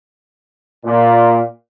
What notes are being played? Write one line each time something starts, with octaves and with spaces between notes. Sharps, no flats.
A#2